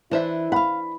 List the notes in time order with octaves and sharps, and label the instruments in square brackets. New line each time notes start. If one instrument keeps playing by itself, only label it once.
[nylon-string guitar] E3 [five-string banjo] D4 C5 E5 [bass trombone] E4
[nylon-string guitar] F5 F#5 [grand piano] B5